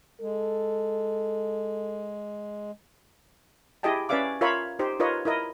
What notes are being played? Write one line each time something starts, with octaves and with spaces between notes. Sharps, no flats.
G#3 A4
E4 G4 G#4 D#5 G5 A5
C#4 B4 D5 E5 F5 D6
F4 A#4 C#5 E5 F5 B5
D#4 G4 C5
D#4 F4 A#4 B4 C#5 D#5
E4 A#4 D#5